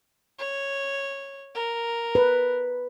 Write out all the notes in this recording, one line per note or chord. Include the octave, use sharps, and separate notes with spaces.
C#5
A#4
B4